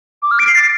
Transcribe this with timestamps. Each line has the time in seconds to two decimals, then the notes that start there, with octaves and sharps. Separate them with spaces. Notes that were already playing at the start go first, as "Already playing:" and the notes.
0.23 D6
0.31 F6
0.39 D7
0.47 C7
0.55 A6